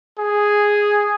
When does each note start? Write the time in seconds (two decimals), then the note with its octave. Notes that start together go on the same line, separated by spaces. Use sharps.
0.18 G#4